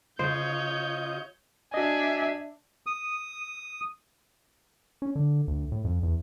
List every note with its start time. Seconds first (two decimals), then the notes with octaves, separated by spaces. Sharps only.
0.19 C#3 F4 C5 C#5 D#5 A5 G6
1.74 D4 F#4 D#5 E5 G#5
2.86 D#6
5.02 C#4
5.16 D3
5.48 D2
5.72 A2
5.85 F2
6.03 E2